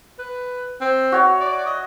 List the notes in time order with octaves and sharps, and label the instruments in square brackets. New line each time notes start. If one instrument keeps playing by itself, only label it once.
[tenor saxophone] B4
C4
[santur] F#4 C#5 E5
[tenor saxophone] D5
D#5